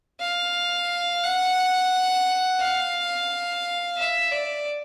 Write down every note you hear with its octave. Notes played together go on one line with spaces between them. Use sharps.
F5
F#5
F5
E5
D5